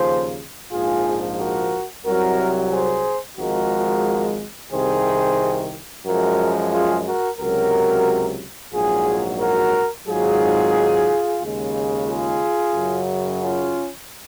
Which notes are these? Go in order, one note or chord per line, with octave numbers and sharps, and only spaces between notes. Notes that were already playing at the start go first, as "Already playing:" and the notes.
Already playing: D#2 C#3 F3 G#4 C5
A#1 G#2 F3 F4 G#4
F#4 A#4
C2 C3 F#3 F#4 A#4
G#4 C5
G#1 G#2 F3 G#3 F#4 A#4
C2 C3 D#3 G#4 C5
F#2 F3 G#3 F#4 A#4
F4 G#4
F#4 A#4
C#2 C3 F#3 F#4 A#4
A#1 G#2 F#3 F4 G#4
F#4 A#4
G#1 G#2 F#3 F4 G#4
D#2 C#3 G#3
F4 G#4
F#2 C#3 F#3
C#4 F4